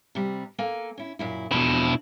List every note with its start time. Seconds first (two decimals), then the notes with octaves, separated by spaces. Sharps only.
0.15 C3 G3
0.59 A#3 A4 G#5
0.98 C#4 E4
1.19 F#2 A#2 E4
1.52 F2 B2 F3 D4 E4